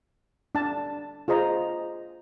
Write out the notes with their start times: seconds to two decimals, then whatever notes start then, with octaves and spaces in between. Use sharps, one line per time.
0.55 D4 A5
1.28 F4 G#4 C5 D#5 A#5